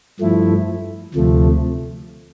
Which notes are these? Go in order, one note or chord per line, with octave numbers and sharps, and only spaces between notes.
G2 F3 A3 E4
D2 C3 F3 A3